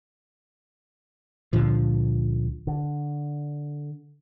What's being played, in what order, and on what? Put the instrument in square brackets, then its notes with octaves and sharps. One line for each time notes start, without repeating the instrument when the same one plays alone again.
[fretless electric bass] C#2 A#2 D3 F3
[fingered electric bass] D3